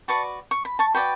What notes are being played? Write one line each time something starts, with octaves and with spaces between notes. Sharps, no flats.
F#4 B4 D5 A5 C#6
C#6
B5
A5 C#6
F#4 B4 D5 G5 B5